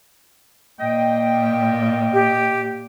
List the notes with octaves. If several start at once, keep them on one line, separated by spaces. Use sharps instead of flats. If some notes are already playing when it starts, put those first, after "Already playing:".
A#2 D#5 G5
G4